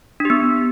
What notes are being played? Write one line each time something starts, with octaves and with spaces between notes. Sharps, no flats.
B3 D4 G4